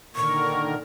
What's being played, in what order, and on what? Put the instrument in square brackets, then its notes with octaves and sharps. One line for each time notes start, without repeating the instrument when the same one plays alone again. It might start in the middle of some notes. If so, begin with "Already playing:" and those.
[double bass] A#2 [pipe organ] D3 D#3 A#4 [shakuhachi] C#6